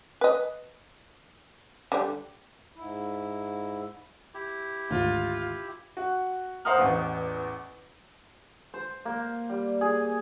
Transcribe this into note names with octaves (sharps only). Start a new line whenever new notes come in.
B4 D#5
D3 G3
G#2 E4
E4 G4
G#1 D2 F4
F#4
C5 F5 F#5 A#5 D#6 F6
A1 E2
C5
A#3
G3
G#4